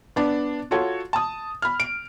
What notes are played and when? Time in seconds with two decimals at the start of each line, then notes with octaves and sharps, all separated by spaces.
0.16 B3 D4
0.71 F4 F#4 A4 C#5
1.13 A5 D#6
1.62 B5 F6
1.80 D7